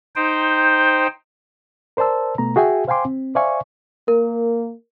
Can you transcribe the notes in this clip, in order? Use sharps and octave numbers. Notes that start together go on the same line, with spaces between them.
D#4 C5 G5
A#4 C5 D5 A5 E6
B2 A3 B3 A#5
F#4 G#4 E5 G5 G#5
C5 F5 G5 G#5 C6 D6
C4
C5 D5 E5 F5 G#5 C#6
A#3 A#4